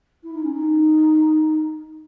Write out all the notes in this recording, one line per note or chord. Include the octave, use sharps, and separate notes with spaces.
E4
D#4
C#4
D#4